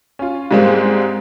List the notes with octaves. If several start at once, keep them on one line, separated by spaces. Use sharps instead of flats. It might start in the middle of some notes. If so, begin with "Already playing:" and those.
C#4 F4
G#2 G3 G#3 A#3 C4 G4